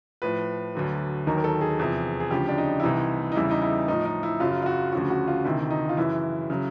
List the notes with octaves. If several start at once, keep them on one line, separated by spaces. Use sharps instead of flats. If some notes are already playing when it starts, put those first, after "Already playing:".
A2 F3 B4
D2 D3 F#3
D#2 D#3 F#3 A#4
A#4
A4
G#4
E2 C3 F3
G#4
D2 C#3 F3 G4
D4
D#4
E4
C2 C3 E3 D#4
D#4
E2 C#3 E3 G3 E4
D#4
E4
A2 F3 D#4
D#4
E4
F#2 C#3 F#3 F4
F4
F#4
D2 C#3 F3 F#4
F#4
F4
D2 C3 D#3 E4
D#4
F4
F#2 C#3 E3 E4
C#3 F#3